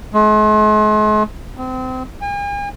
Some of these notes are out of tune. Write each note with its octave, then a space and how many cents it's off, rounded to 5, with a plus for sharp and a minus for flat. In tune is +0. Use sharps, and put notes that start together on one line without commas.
G#3 +45
C4 -30
G#5 -45